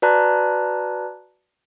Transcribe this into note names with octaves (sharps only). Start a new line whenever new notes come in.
F#4 B4 D5 A5 A#5 F#6